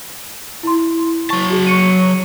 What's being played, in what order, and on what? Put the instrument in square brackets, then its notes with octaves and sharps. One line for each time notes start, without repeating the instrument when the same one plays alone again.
[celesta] E4 C6
[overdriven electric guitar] F#3 A5 [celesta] C#6
[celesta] F#4 G#4
C#6 C#7 D#7